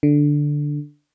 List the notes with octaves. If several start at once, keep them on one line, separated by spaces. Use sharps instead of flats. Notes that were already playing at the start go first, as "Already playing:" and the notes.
D3